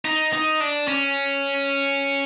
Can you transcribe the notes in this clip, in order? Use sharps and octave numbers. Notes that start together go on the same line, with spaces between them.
D#4
D#4
D4
C#4